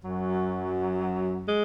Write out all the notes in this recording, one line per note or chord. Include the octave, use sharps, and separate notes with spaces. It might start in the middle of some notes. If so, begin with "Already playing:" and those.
F#2 F#3
G#3